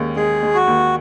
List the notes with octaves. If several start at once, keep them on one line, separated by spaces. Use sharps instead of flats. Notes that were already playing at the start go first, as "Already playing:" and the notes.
Already playing: D#2 G#3 C#4
G#3 G#4
G#3
F#4
D#2